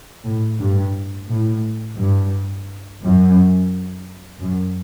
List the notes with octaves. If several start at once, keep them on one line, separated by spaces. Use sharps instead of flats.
A2
G2
A2
G2
F#2
F#2